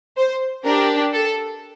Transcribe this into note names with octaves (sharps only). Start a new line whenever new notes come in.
C5
D4 G4 A#4
A4